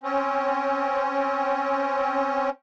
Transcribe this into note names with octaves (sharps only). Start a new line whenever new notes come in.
C4 C#4